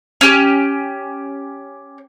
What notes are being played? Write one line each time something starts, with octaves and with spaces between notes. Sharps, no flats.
C#4 G4